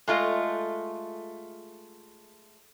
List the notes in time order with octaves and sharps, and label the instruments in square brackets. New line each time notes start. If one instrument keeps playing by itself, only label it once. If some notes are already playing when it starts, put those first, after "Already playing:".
[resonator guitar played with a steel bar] G#3 A3 F4 D#5